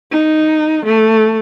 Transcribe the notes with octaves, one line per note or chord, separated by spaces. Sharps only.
D#4
A3